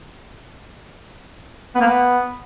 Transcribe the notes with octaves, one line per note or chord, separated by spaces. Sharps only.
B3
A#3
B3